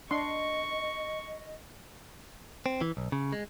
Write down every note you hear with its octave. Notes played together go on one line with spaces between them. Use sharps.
D4 D#5 C6 C#6
C4
E3
B1
C#3
G#3